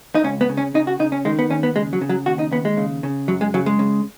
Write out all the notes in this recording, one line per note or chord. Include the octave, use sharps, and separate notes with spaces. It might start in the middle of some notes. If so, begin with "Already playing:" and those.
D#4
C#2 C#4
B3
C#3
C#4
C#3 D#4
F#4
C#3 D#4
C#4
D#3 G#3
B3
D#2 C#4
B3
C#3 G#3
F#3
C#3
F#3
D#2 F#4
D#4
D#2 B3
G#3
C#3
C#3
F#2 F#3
G#3
C#3 F#3
G#3
C#3